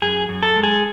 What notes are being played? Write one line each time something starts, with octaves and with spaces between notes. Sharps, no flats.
F#2 G#4
F#2
A4
G#3
G#4